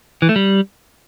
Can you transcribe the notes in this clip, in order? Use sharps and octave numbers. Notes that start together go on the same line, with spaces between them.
E3
A3
G3